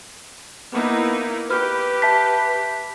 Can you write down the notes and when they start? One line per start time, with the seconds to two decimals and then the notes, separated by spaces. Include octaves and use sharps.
0.73 A#3 B3 D#4 E4
1.51 G4 B4 F6
2.02 E5 A5 B6